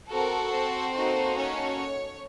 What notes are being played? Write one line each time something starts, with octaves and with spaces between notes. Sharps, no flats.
C4 F#4 A4 A#4
C4 C5
A#3 D#4 F#4 A4
C#4 C#5